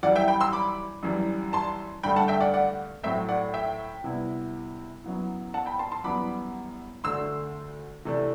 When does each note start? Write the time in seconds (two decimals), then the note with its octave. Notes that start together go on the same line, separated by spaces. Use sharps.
0.03 F#2 E3 G3 D5 F#5
0.16 E5 G5
0.28 G5 B5
0.41 C6 E6
0.53 B5 D6
1.03 F#2 E3 G3 D4
1.53 A5 C6
2.03 G2 D3 A3 G5 B5
2.16 F#5 A5
2.28 E5 G5
2.40 D5 F#5
2.54 D5 F#5
3.03 A2 F#3 A3 C4 E5 G5
3.29 D5 F#5
3.54 E5 G5
4.04 C3 G3 B3 E4
5.04 F#2 F#3 B3 E4
5.54 F#5 A5
5.66 G5 B5
5.79 A5 C6
5.92 A5 C6
6.04 F#2 E3 G3 B3 B5 D6
7.04 D2 D3 A3 D4 C6 E6
8.05 C3 E3 A3 D4